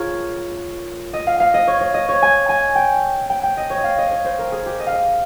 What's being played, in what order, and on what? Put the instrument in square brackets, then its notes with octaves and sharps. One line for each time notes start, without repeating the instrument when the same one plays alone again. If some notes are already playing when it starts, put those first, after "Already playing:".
Already playing: [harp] F4 G#4 A#4 C#5
D#5
F5
F5
D#5
C#5
C#5
D#5
C#5
G#5
G#5
G5
G5
G5
D#5
C#5
D#5
F5
D#5
C#5
C5
A#4
G#4
G4
D#5
F5
D#5